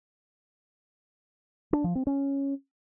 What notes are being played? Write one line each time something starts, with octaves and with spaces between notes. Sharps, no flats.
D4
F3
C4
C#4